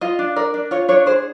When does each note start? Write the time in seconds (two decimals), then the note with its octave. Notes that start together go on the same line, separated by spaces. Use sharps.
0.01 F4 D#5
0.19 D4
0.36 A#4 D5
0.54 D4
0.71 F4 C#5
0.88 D4 C#5
1.06 G#4 C5